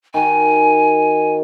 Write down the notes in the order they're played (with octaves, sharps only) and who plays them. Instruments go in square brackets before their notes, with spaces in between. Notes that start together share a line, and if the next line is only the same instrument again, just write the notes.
[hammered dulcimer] D#3 F#4 [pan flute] G#5